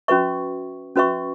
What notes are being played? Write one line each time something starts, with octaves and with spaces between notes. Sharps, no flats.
C#4 F#4 B4 E5 C#6
C#4 F#4 B4 E5 C#6